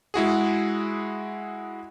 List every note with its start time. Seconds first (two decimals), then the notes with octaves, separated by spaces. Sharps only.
0.14 G#3 E4 F#4 G#4